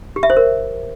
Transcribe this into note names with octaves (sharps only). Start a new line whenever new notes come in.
G4
E5
C5
A#4